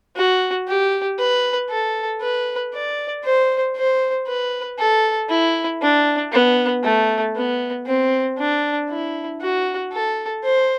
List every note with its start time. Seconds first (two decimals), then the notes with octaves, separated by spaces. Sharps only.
0.16 F#4
0.68 G4
1.19 B4
1.70 A4
2.22 B4
2.73 D5
3.24 C5
3.76 C5
4.27 B4
4.79 A4
5.29 E4
5.82 D4
6.32 B3
6.84 A3
7.36 B3
7.86 C4
8.38 D4
8.89 E4
9.41 F#4
9.92 A4
10.44 C5